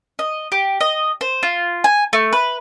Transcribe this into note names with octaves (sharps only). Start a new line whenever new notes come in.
D#5
G4
D#5
C5
F4
G#5
A3
B4